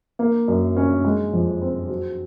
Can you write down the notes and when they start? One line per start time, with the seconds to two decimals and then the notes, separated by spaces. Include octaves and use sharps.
0.19 A#3
0.48 F#2
0.76 C#4
1.04 G#3
1.33 F2
1.62 C4
1.89 F#3